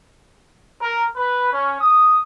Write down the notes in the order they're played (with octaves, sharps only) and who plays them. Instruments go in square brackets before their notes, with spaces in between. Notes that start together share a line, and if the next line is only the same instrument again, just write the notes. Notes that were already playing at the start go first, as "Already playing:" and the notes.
[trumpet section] A#4
B4
C#4
D#6